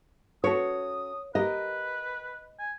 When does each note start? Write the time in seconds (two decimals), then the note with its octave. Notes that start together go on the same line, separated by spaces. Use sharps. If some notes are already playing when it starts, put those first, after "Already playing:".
0.44 C#4 F#4 A4 C#5 D#6
1.35 G4 A#4 B4 D#5
2.59 G#5